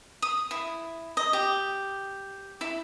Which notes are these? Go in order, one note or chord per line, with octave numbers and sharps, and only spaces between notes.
D#6
E4
D#5
G4
E4